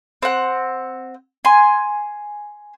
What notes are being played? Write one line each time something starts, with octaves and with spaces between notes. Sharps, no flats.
C4 F#5
G#5 C6